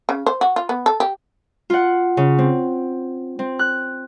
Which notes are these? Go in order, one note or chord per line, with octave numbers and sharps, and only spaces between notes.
C#3
C5
F#4
F4
B3
A4
G4
F4 F#5
C#3
C4
C4
F#6